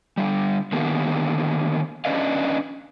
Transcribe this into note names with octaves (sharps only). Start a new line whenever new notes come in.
D3 G3
D3 D#3 A#3 B3 G4
C#4 D4 B4 D5 D#5 F5